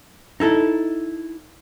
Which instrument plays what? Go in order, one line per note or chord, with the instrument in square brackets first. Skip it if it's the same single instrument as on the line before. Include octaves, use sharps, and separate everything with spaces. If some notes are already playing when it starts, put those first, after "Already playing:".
[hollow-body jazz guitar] D#4 E4 A4